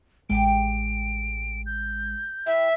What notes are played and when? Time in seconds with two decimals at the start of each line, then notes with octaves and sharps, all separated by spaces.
0.30 A1 G#3 G4 G5 G#5 D7
0.47 D7
1.66 G6
2.46 E4 G4 B4 E5